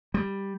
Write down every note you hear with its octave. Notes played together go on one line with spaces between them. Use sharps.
G3